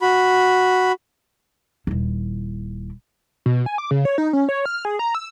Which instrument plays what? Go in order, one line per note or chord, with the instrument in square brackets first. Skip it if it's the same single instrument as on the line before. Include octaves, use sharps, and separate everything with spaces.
[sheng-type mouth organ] F#4 B5
[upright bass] D#1 E4
[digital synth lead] B2
G#5
D6
C#3
C#5
D#4
C#4
C#5
F6
G#4
A#5
E6